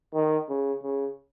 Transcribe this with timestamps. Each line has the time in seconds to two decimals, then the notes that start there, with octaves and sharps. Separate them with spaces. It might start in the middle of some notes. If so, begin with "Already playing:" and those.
0.14 D#3
0.49 C#3
0.83 C#3